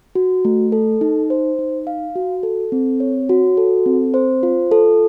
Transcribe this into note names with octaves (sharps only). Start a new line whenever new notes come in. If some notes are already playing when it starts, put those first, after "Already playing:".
F#4
A3
A4
D#4
C5
D#4
F5
F#4
A4
C4
C#5
F#4
A4
C4
C5
F4
A4